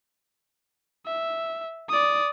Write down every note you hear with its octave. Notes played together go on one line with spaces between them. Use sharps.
E5
D5 D#6